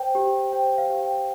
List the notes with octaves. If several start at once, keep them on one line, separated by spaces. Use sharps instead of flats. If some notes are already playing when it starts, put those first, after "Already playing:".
Already playing: C5 G5
G4
C5 G5
F5
G4
G5